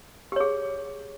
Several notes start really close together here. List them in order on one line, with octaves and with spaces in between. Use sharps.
G4 C#5 G#4